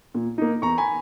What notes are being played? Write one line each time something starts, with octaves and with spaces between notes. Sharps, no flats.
A#2
A#3 D#4
E2 A#5 C#6
G#5 B5